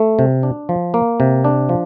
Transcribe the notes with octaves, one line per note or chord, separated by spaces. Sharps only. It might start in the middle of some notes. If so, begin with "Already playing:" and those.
Already playing: A3
C3
D4
F3
A#3
C3
D4
F3